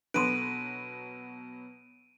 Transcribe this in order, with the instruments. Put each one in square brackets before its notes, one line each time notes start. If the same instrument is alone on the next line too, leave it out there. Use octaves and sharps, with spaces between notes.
[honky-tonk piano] B2 F#3 [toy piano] D4 A4 C6 [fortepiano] B4 [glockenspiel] D7 D#7